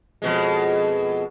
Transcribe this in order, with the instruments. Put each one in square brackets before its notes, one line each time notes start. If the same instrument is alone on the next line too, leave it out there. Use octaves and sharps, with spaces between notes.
[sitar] F2 B2 G#3